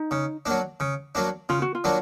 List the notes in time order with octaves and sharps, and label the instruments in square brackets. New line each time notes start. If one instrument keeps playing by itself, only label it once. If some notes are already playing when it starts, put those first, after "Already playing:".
Already playing: [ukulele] D#4
[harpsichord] C#3
F#3 A#3 D4
C#3
F#3 A#3 D4
[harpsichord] C#3 [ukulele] F4
[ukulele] F#4
F4
[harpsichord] F#3 A#3 D4